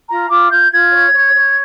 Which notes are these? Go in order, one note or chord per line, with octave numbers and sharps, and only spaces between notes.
F4 A#5
F4 D6
F4 G6
F4 G#6
C#5
C#5
C#5